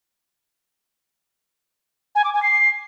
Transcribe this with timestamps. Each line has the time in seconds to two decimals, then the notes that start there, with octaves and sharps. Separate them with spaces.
2.15 G#5
2.24 D6
2.33 G#5
2.42 C7